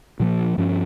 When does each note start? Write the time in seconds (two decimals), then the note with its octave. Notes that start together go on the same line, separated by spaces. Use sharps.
0.20 A#2 F3 A#3
0.58 G2 F3 C#4